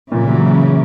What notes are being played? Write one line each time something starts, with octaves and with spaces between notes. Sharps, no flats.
A#2 C#3 E3
F#3